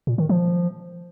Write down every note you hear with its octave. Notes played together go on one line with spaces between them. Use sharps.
A#2
D#3
F3